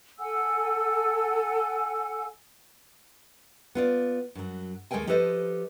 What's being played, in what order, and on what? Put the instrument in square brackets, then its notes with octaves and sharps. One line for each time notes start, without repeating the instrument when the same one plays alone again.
[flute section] A4 F#5 G#5 E6
[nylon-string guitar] B3 F4 D5
F#2 F#3
D#2 G#3 A3 A#4 G5 G#5
F3 G4 A4 B4 C5 D#5